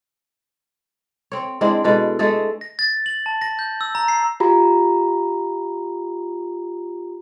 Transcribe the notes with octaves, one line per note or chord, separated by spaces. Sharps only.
C4 C#5
G#3 C4 D4 E4
B2 G#3 A4 B4
G#3 A3 G#4 A4
A#6
A6
F#7
A5
A#6
G6
E6
A#5
C7
F4 G4 A#5 B5